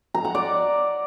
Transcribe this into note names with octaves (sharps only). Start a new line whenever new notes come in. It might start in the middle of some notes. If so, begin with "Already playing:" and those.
A#5
F#5
D5